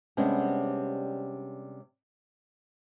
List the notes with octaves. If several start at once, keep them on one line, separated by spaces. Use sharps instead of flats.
C3 G3 G#3 B3 C#4 D4